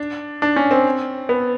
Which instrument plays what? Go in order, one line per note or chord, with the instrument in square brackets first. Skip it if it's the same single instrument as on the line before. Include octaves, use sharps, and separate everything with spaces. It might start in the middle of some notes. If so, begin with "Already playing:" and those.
Already playing: [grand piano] D4
D4
C#4
C4
B3